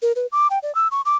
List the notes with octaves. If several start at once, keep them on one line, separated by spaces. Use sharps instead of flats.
A#4
B4
D6
G5
D5
E6
C#6
D6